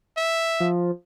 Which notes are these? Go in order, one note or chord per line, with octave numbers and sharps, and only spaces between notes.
E5
F3